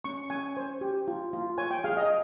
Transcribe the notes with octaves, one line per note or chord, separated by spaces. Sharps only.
C#4 C#6
C#4 G#5
C5
G4
F4
F4
C#5 G#5
G5
G#4 F5
D#5